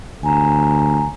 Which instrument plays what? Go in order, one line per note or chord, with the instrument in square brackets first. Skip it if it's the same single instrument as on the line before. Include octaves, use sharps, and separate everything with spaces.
[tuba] D2 [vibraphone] G#5 A#5